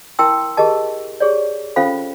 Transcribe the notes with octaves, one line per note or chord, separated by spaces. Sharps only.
E4 A#4 G5 A5 C6 E6
G4 G#4 A#4 D#5 A5
G4 G#4 C#5 D5
C#4 F4 A4 C5 F5 B5